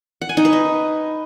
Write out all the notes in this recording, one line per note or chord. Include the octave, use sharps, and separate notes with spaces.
F#5
G#5
D#4
B4
D#5